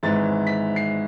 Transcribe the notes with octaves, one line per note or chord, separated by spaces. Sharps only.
G#1 G#2 E3 A6
B6
C7